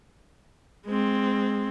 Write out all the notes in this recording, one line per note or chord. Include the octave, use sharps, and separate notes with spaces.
G#3 C4